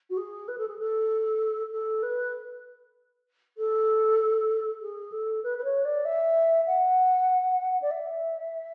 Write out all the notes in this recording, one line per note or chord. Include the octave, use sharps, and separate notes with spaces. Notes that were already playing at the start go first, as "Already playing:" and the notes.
F#4
G#4
B4
A4
G#4
A4
A4
B4
A4
G#4
A4
B4
B4
C#5
D5
E5
F#5
D5
E5